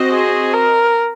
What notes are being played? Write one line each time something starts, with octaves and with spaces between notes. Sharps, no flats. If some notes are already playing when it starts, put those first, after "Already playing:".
Already playing: C4 F#4 C5 D#5
G#4
A#4